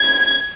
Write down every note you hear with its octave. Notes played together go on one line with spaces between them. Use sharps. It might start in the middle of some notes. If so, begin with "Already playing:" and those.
Already playing: G#6